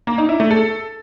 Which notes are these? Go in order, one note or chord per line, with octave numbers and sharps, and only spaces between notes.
A#3
D#4
E4
A3
A4